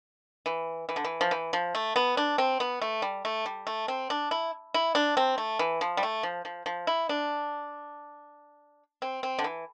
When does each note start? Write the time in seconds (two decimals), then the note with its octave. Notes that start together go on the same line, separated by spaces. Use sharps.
0.46 E3
0.89 E3
0.96 D3
1.05 E3
1.21 F3
1.31 E3
1.53 F3
1.75 A3
1.96 B3
2.17 D4
2.38 C4
2.60 B3
2.82 A3
3.02 G3
3.25 A3
3.46 G3
3.67 A3
3.88 C4
4.10 D4
4.31 E4
4.74 E4
4.95 D4
5.17 C4
5.38 A3
5.59 E3
5.81 F3
5.97 G3
6.03 A3
6.23 F3
6.45 F3
6.66 F3
6.87 E4
7.09 D4
9.02 C4
9.23 C4
9.39 D3
9.44 E3